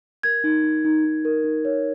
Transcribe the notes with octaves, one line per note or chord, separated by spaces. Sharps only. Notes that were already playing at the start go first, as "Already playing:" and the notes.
A#4 G#6
D#4
D#4
D#4
D#4
A#4
D#4
C#5